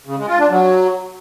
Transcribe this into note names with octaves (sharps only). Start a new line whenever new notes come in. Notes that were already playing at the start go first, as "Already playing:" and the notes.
C#3
G#3
F4
D4
F#3